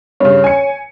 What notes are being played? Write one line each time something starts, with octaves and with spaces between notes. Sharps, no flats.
G2 C#3 C#5
G#5 C#7